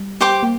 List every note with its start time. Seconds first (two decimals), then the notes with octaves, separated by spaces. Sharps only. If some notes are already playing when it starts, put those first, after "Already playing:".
Already playing: G3
0.21 G4 C5 G5 D6
0.43 A#3